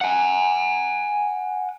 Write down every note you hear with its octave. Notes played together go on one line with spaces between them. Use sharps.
F#5 G#5